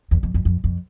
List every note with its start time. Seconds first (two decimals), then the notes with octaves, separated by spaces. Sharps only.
0.11 E2
0.23 F2
0.34 F2
0.45 F2
0.64 F2